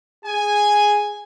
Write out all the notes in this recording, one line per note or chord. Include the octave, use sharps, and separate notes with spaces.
G#4 G#5